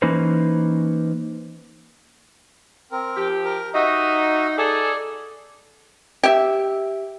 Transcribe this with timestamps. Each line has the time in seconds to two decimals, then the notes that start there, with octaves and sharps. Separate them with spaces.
0.02 E3 A#3 C#4 D#4 B4 C5
2.92 C4 A#4
3.16 F3 G4
3.45 A#4
3.74 D#4 F#4 D#5 E5
4.58 G#4 A4 D5
6.23 G4 E5